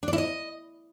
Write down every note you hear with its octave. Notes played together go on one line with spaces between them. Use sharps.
D4
D5
E4
D#5